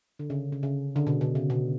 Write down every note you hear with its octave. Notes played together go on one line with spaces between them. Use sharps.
D3
C#3
C#3
C#3
D3
B2
B2
C#3
B2